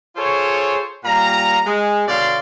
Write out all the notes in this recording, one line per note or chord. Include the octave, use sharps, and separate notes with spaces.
F4 G#4 A4 C5 C#5
A#2 G3 F5 A#5
G#3
B2 D3 C#5 D5 F5 C6